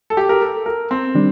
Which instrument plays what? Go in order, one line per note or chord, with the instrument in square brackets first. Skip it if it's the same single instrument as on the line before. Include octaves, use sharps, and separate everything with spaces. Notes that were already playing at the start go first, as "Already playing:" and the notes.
[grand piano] A4
G4
A#4
A4
A#4
C4
[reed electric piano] D#3 G3 D4